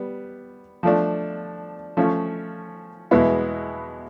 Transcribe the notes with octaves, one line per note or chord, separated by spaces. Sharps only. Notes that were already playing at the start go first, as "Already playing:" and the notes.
Already playing: G3 B3
F3 A3 D4
F3 A3 C#4
E2 B2 G#3 B3 E4